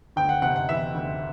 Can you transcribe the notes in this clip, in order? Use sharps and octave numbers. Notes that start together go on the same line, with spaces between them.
D2 G5
F#5
C3 F#5
F#5
E3 E5
D2